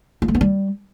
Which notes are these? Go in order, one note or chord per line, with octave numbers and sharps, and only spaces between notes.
F4
A3
B3
G3